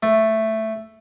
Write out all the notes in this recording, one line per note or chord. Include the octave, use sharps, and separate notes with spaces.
A3